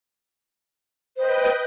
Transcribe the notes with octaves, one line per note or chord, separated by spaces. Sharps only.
B4 C5 D#5 G5